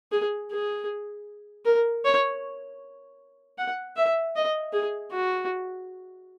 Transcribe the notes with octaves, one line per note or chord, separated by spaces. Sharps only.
G#4
G#4
A#4
C#5
F#5
E5
D#5
G#4
F#4